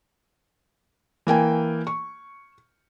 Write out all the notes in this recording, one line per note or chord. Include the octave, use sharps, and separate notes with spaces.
E3 A#3 G5 G#5
C#6